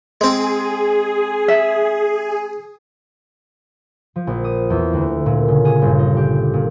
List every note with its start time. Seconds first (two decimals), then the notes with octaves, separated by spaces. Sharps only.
0.21 G#3 C4 G#4
1.48 E5
4.16 F3
4.27 A#1
4.44 D#6
4.70 E2
4.93 D2
5.26 A#2
5.48 C#3
5.65 G#4
5.82 G1
5.98 D#4
6.17 G4
6.53 A#2